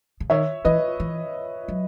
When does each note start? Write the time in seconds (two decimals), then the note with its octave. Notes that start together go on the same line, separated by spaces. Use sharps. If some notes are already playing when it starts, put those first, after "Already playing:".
0.20 C#3
0.30 D#3 C#5 E5
0.65 E3 B4 D#5
1.00 E3
1.68 F#3